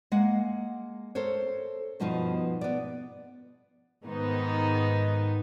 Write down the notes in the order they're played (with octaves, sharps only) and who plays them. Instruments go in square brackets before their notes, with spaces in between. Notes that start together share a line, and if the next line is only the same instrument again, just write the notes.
[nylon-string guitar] G#3 A#3 F#5
A4 A#4 C5 C#5
G2 B2 F3 B3 D#4
B3 D5
[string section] G#2 D#3 B3 D#4